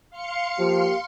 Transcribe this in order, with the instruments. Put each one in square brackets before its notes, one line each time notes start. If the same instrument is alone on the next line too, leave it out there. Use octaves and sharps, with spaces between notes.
[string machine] F5 C6 C#7
[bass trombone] F3 [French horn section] A#3 F4 G4